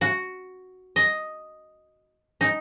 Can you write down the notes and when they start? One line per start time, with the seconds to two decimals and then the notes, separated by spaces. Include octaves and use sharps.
0.01 F#4
0.96 D#5
2.41 D#4